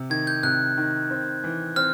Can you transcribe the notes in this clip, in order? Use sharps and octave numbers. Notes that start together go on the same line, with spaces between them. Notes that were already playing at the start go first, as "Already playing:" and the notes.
Already playing: C3
D#3 G#6
G6
C3 F#6
D#3
C4
E3
C4 F6